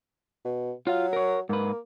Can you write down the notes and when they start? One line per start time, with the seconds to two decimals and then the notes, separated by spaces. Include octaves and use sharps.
0.45 B2
0.87 F#3 F4 F5
1.13 A#4 C#5
1.49 G#2 A#3 B4